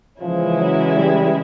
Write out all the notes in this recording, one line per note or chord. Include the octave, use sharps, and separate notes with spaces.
C#3 E3 F3 G#3 C#4 E4
F#3
G3